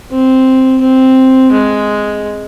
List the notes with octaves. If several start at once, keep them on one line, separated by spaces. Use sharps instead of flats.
C4
C4
G#3